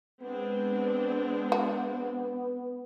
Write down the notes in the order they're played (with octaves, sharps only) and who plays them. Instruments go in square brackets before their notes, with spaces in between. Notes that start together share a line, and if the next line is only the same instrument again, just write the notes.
[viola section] G#3 C4 D4 [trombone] B3
[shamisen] F#4